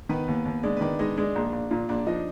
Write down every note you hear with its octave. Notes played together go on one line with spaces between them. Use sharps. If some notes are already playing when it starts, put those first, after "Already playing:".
D#3 B3 B4
D#2
D#2
G#3 D4 D5
B4
D#3 D4 D5
G#3 D#4 D#5
G#3 D4 D5
A#1
A#1
A#2
A#1 D4 D5
F3 D#4 D#5